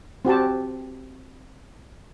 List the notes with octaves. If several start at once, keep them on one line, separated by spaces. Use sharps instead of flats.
C4 F#4 G4 A5